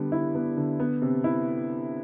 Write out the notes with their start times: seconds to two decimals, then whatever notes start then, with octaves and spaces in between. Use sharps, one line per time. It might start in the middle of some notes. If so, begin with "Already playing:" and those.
Already playing: D3 G3 B3
0.12 E4
0.35 B3
0.57 D3
0.80 B3
1.02 C3
1.24 E4